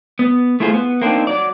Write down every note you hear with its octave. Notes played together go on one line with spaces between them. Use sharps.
B3
A3 E4 F4 G#4 C5
B3
A#3 C4 D4 D#4
F#3 D5